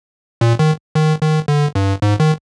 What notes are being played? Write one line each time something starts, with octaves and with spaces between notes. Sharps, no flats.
A#2
D#3
D#3
D#3
D3
G2
G#2
D#3